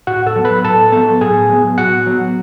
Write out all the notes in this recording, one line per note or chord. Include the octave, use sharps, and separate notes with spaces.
A2 F#4 F#5
A4 A5
F#3 B3
B4 B5
A2 A4 A5
F#3 B3 A4 A5
A2 G#4 G#5
F#3 B3
A2 F#4 F#5
F#3 B3